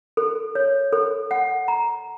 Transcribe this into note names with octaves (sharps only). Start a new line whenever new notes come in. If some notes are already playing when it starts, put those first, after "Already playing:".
A4
C#5
A4
F#5
A#5